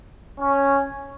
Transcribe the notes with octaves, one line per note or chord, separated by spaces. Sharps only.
C#4